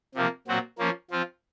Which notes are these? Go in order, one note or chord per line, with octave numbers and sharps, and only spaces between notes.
C3 F3 A#3
A#2 F#3 C4 F#4
F3 A#3 C#4
F3 C4 F4